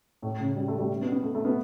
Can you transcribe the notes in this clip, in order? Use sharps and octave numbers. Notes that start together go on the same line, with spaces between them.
A2
C#3
G3
A3
G3
B3
B3
A3
A3
B3